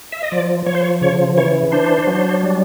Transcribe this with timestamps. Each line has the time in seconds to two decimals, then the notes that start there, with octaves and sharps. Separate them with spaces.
0.12 E5
0.23 D#5
0.31 F3 D5
0.66 F3 C#5
0.75 C5
0.83 C#5
1.02 C#3 C#5
1.37 E3 C#5
1.72 D4 C5
2.07 F#3
2.43 G3